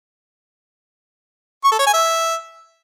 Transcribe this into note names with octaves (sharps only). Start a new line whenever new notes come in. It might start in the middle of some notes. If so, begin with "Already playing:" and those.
C#6
A4
C#5
G#5
E5